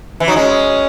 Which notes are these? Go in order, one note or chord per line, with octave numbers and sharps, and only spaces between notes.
E3
F#3 D#4
G#3 C#4